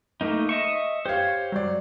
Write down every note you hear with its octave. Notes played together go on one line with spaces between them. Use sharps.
A3 A#3 D#4
D#5 E5 C#6
G4 C5 C#5 F5
F#3 D5